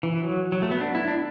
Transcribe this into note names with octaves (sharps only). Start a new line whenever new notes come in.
E3
F#3
F#3
A3
B3
D4
E4
D4